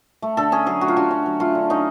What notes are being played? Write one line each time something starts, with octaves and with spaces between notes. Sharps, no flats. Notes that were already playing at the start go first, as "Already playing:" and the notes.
A3
D3 A4
C#4 G#4
F#3 G#4
A3 F#4
F4
D3 F#4
C#4
F#3
A3 F4
D3
C#4 D#4